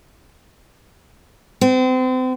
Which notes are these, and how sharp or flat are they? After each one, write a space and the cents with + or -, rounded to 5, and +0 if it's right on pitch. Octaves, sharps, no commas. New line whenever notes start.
C4 -35